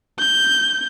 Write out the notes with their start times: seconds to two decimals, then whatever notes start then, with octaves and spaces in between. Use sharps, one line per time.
0.19 G6